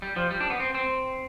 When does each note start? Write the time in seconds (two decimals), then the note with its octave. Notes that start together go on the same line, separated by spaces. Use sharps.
0.02 G3
0.16 F3
0.31 G3
0.40 D4
0.50 B3
0.60 C4
0.75 C4